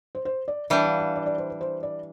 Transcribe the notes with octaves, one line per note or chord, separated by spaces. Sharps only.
C5
C5
D5
E3 G3 D4 E5
F5
F5
D5
D5
C5
B4
C5
D5